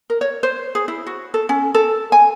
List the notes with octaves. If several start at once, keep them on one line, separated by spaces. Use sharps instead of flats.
A#4
C#5
C5
G#4
E4
F#4
A4
C#4
A4
G#5